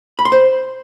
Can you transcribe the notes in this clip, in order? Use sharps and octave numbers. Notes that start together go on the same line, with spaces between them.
B5
C6
C5